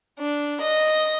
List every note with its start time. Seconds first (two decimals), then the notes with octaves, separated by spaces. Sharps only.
0.19 D4
0.61 D#5